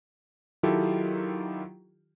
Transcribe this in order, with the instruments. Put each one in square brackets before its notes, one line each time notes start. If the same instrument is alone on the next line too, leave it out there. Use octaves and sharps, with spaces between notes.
[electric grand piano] D#3 F#3 E4 F4 G4 A4